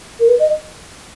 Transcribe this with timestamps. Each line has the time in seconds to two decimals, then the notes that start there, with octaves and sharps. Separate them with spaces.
0.20 A#4
0.28 B4
0.39 D#5